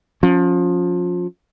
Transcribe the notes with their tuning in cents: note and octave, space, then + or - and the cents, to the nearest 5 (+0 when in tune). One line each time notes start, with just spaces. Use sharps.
F3 +25 C#4 +0